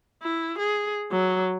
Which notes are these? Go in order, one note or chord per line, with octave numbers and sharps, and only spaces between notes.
E4
G#4
F#3